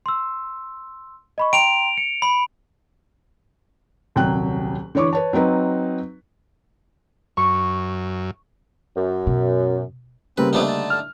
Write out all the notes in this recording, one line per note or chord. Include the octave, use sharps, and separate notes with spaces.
C6 E6
D#5 B5 C#6
G5 A#5 C6 D7 F7
C#7
B5
D#1 C2 F#3 G5 F#6
D3 E3 C#5 C#6 D6
B4 C#5 A5
F#3 C4 D#4 B4
F#2 C#6
F#2
B2
C#3 G3 A#3 C4 B4
C3 F3 A3 B3 D4 D#4
D3 A5
F6